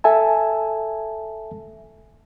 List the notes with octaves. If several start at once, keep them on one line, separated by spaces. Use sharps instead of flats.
A4 E5 G#5 A5